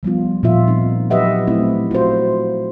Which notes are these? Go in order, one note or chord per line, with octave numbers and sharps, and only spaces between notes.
F3 G3 B3 F4
A#2 F3 F4 E5
C4 D#4
F#3 G4 B4 D#5 E5 F#5
A3 C4 E4
F4 F#4 C5